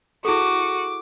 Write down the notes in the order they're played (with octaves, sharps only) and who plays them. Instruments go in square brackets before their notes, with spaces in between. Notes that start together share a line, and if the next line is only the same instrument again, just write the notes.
[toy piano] E4 G#4 A4 [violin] F#4 [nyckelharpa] D6